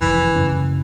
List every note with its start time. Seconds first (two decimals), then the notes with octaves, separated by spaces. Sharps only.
0.01 F1 F#2 D#3 E3
0.36 F#2 C#3 C#4